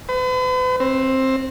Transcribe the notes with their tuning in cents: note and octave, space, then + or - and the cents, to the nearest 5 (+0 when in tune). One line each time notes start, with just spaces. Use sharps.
B4 +45
C4 +15